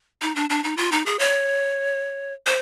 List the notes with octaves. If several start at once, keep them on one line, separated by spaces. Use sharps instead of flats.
D#4
D4
D4
D#4
F4
D#4
G#4
C#5
C5